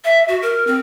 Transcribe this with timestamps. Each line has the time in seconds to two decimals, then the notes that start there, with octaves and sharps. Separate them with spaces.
0.05 E5
0.28 F#4
0.42 A#4
0.67 C4